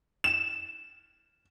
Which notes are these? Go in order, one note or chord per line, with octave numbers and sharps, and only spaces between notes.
E7